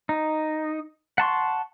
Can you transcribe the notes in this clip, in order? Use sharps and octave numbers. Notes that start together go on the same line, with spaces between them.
D#4
F#5 A5 C6 C#6